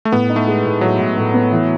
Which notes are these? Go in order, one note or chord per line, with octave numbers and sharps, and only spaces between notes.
A3
A2 B3
D#4
A3
G#3
A2
A2 F#3
A2
A2
B3
E3